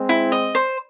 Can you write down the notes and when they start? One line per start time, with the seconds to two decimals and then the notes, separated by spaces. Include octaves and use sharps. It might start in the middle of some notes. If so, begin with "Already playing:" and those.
Already playing: G#3 C4
0.09 E4
0.32 D#5
0.55 C5